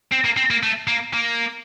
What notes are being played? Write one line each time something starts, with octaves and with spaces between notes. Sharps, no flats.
C4
A#3
C4
A#3
A3
A#3
A#3